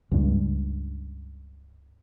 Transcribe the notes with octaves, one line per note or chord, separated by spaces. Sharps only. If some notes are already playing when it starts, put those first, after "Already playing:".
C#2 G2